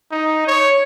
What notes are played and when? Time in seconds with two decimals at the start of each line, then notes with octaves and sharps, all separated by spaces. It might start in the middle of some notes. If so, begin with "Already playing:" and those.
0.12 D#4
0.47 C#5